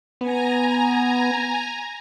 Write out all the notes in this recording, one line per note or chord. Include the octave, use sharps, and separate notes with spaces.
B3 G#5 A#5